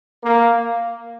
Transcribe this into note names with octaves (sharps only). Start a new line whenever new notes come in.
A#3